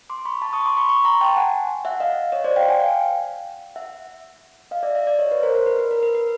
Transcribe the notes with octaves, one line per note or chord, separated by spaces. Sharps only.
C6 D6
B5 C#6
A5 B5
C#6 D#6
C6 D6
B5 C#6
B5 C#6
A#5 C6
G5 A5
F#5 G#5
E5 F#5
D#5 F5
C#5 D#5
C5 D5
F5 G5
F#5 G#5
F5 G5
E5 F#5
D#5 F5
D5 E5
D5 E5
D5 E5
C#5 D#5
B4 C#5
A#4 C5
A#4
B4
B4
A#4
B4
B4